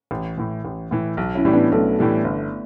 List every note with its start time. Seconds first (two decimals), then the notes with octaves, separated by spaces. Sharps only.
0.11 A1
0.37 A2 E3
0.65 A1
0.91 A2 E3
1.17 B1
1.35 C#4 E4
1.45 A2 E3 G3
1.53 B3 D4
1.72 B1 A3 C#4
1.99 A2 E3 G3
2.24 G1